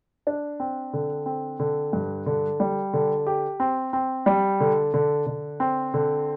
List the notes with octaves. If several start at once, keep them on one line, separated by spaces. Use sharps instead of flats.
D4
C4
D3
C4
D3
G2
D3
G3
D3
G4
C4
C4
G3
D3
D3
D3
C4
D3